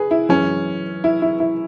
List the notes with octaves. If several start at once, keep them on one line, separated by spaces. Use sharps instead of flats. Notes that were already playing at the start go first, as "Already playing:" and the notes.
Already playing: G#4 B4
E4
F#2 E3 G#3 C#4
E4
E4
E4